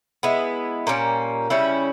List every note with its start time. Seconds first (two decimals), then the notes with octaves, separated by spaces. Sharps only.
0.23 G#3 B3 E4
0.87 A#2 G3 A#3 C#4
1.50 C#3 G3 C#4 E4